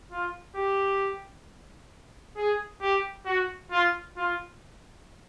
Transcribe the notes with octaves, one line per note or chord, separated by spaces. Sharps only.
F4
G4
G#4
G4
F#4
F4
F4